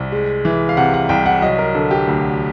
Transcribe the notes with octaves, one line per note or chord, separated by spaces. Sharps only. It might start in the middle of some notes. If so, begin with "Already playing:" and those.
Already playing: C2
G#3
E3
F5
C3 F#5
F#5
C2 G5
F#5
F#3 D#5
A#4
D3 A4
G4
D2